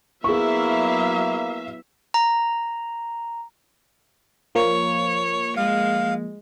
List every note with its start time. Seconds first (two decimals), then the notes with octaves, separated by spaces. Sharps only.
0.24 F#3 A#3 B3 E4 G#4 E5 F5 C#6
2.14 A#5
4.55 F3 A#3 C#5
5.57 G#3 F5